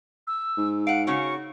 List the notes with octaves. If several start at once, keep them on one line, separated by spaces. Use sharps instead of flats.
E6
G#2
F5 F#5 D7
C#3 C#4 F#4 C#6